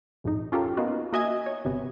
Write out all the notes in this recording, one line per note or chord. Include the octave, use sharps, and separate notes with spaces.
A#1 F2 G#2 D#4
C#4 F4 G4 A4 A#4
A#3 B3 D#4 F4 F#4
A#3 F#4 D#5 E5 G#5 G#6
C#5
G1 C3 B3